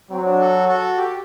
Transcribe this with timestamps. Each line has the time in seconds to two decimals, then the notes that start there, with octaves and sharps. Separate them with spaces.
0.10 F#3 C4
0.25 D4
0.39 F#4 A4
0.68 F#4 A4
0.97 G4